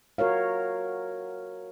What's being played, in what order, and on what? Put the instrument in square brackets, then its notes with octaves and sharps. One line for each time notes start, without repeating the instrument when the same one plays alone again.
[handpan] F#4 A#4 C#5 F5